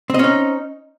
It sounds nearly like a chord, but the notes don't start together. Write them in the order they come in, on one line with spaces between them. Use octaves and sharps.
C4 D#5 C#4 D#4